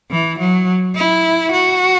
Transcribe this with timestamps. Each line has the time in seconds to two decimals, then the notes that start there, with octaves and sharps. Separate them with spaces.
0.11 E3
0.39 F#3
0.96 E4
1.52 F#4